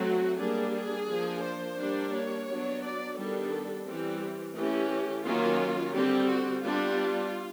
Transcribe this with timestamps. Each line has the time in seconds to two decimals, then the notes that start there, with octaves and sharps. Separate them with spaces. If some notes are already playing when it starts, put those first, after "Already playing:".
Already playing: F#3 A3 C4 F#4
0.39 G3 A#3 D4 G#4
0.75 G#4
1.09 F3 A#3 D4
1.43 C5
1.79 G3 A#3 D4
2.13 C#5
2.48 F#3 B3 D4
2.83 D5
3.17 D#3 G3 B3 D4 A4
3.86 E3 G3 C4
4.56 E3 A3 C#4 G4
5.25 D#3 F#3 A#3 C#4 F4
5.94 D3 G3 C4 G4
6.29 F#4
6.64 G3 B3 D4 F4